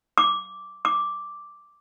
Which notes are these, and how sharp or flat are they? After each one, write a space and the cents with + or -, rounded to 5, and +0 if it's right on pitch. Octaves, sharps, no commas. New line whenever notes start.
D6 -5
D6 +0